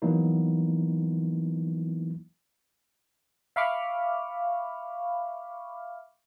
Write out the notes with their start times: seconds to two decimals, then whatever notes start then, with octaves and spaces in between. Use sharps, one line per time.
0.02 E3 F#3 A#3 B3 D#4 E4
3.56 E5 F5 B5 C#6 D6 F6